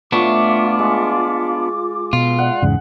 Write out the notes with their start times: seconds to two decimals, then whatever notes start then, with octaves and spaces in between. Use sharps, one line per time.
0.12 A2 B3 D4 F4 C#6 D6
0.79 G#3
2.13 B2 F4
2.38 D5 F#5
2.62 E2 G#2 C#3